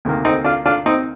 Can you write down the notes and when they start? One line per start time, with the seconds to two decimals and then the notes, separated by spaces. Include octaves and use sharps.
0.05 D2 C3 D#3 A#3
0.25 C4 D#4
0.44 D4 F4
0.65 D4 F4
0.86 C4 D#4